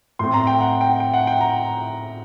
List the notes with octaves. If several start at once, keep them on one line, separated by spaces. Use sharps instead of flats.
A2 A3 C4 C6
A#5
G5
F#5
G5
G5
F#5
G5
A#5